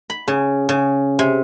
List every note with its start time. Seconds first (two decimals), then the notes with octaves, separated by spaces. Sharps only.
0.10 B5
0.28 C#3
0.69 C#3
1.19 C3